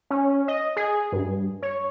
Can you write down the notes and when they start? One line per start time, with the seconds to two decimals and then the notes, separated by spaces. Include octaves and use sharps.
0.10 C#4
0.48 D#5
0.76 G#4
1.12 G2
1.63 C#5